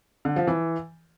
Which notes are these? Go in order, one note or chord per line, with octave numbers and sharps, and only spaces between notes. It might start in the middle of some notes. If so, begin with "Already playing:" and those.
D3
F3
E3